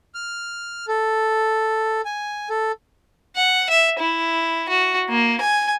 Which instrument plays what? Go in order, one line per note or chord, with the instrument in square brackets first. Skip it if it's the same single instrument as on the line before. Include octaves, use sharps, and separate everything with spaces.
[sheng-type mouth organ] F6
A4
G#5
A4
[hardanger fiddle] F#5
E5
E4
F#4
A#3
G#5